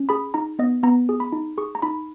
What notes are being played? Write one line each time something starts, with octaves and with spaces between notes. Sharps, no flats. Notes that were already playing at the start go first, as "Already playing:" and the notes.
Already playing: C#4
G#4 B5
D#4 A#5
B3 D#5
B3 A#5
G#4
B5
D#4
G#4 C#6
A#5
D#4 B5